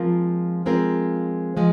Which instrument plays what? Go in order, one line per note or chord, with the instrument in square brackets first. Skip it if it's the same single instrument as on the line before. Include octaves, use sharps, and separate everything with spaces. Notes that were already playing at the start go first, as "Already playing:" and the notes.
Already playing: [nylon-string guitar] F3 G#3 C4 F4 A#4
F3 G#3 C4 F4 A#4
F3 G#3